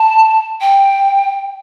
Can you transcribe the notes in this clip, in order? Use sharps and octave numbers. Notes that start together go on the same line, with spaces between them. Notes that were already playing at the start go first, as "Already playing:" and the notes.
Already playing: A5
G5